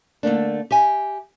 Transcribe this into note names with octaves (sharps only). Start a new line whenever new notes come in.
D3 A3 A#3 D4
G4 E5 G#5